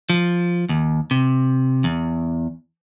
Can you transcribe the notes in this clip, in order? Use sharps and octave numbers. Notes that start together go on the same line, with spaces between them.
F3
D#2
C3
E2